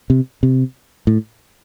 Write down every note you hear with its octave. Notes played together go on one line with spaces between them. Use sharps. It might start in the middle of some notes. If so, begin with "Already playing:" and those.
C3
C3
A2